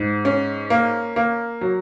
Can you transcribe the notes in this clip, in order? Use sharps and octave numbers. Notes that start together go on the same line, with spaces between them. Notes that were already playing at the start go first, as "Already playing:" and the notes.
Already playing: G#2
C#4
A#3
A#3
F#3